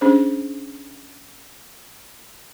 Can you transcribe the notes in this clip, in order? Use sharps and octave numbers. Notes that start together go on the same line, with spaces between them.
C#4 D4 G#4 C5